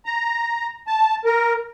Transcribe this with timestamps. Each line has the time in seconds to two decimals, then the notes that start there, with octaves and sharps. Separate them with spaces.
0.06 A#5
0.87 A5
1.25 A#4